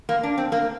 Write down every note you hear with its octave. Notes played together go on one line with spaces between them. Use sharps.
A#3
D4
C4
A#3